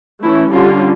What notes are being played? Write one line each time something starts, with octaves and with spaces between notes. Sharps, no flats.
E3 A3 C#4 E4
D3 G3 C#4 F4